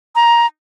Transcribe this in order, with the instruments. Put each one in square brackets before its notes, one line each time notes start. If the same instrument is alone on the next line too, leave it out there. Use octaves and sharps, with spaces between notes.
[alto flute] A#5